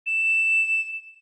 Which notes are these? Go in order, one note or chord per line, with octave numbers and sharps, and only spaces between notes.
E7